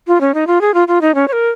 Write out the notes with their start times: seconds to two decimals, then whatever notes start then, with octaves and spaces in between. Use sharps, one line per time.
0.07 F4
0.21 C#4
0.34 D#4
0.47 F4
0.61 G#4
0.74 F4
0.88 F4
1.01 D#4
1.15 C#4
1.28 C#5
1.32 A#4